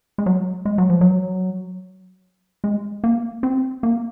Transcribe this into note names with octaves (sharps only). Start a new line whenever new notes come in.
G#3
F#3
G#3
F#3
F3
F#3
G#3
A#3
C4
A#3